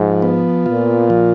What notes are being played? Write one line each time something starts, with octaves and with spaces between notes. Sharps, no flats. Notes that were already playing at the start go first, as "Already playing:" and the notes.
Already playing: G#2 F3
B3
A#2 F4
F3